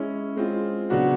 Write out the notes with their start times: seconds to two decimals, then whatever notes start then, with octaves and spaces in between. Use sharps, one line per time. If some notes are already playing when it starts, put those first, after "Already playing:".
Already playing: G#3 C#4 E4
0.36 G#3 C4 F4
0.90 C#3 F#3 B3 D4 F#4